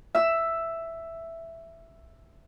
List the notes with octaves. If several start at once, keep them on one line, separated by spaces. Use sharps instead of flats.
E5 E6